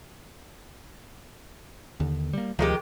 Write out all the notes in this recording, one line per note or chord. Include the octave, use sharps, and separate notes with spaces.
D#2 D3
G3 A#3
D2 D#3 F3 G#3 G4